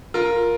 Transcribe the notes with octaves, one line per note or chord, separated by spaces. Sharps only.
F4 A#4